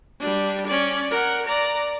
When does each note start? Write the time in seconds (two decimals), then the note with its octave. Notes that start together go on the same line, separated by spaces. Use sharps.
0.20 G3 D4
0.67 C#4 D5
1.11 A#4 F#5
1.46 D5 A#5